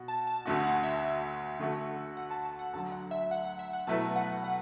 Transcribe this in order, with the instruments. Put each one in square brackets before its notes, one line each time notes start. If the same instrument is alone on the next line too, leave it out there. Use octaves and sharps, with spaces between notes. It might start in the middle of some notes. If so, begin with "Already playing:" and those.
Already playing: [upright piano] B2 F#4
[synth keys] A5
A5
[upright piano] D2 D3 A3 F#4 [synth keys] A5
[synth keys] F#5
E5
[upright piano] D3 A3 F#4 A4
[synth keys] F#5
A5
A5
F#5
[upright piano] D2 D3 F#3 [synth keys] A5
[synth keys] F#5
E5
F#5
F#5
E5
F#5
[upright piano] B2 F#3 A3 E4 B4 [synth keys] A5
[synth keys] F#5
F#5